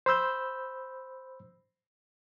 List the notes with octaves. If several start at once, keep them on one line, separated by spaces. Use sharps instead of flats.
C5 B5 E6 G6